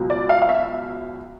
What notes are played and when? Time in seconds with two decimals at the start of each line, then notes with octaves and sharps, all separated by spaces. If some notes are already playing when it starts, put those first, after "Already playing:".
Already playing: C#2 B2 F#3
0.10 D5
0.29 F5
0.42 F5
0.49 E5